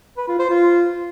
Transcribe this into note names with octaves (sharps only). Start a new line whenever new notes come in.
B4
F4
C5
F4